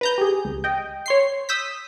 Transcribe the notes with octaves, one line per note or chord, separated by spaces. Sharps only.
B4 A#5 G6
G4 G#4
C#2
D#5 G5
C#5 C6 C7
D#6 E6 G6 B6